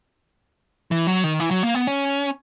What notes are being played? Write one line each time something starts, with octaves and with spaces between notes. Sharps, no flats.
E3
F#3
D#3
E3
F#3
A#3
B3
C#4